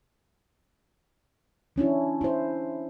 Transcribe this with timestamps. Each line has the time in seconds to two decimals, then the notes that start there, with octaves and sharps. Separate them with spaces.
1.76 E3 C#4 D4 E4
2.21 E4 C5